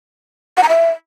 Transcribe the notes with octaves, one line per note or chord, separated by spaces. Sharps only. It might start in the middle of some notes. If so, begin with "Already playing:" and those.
F#5
A#5
E5